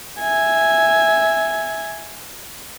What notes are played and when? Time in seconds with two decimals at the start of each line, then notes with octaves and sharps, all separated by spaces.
0.20 E5 G#5